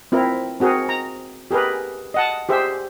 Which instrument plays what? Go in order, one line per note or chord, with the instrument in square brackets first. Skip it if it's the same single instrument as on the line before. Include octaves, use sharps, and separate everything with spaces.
[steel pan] C4 E4 F4 A#4
C4 F#4 G#4 A#4
A#5
G4 G#4 A#4 B4
D#5 F#5 A5
G4 G#4 C5 E5